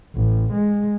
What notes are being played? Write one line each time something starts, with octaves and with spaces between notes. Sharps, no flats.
A1
G#3